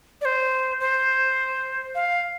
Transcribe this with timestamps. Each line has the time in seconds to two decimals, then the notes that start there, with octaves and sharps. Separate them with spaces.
0.21 D5
0.25 C5
0.80 C5
1.95 F5